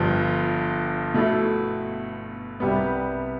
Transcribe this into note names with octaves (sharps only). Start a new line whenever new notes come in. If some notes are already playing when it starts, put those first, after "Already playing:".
Already playing: G1 G2 F3
B2 A3 E4 A4
C2 C3 G3 B3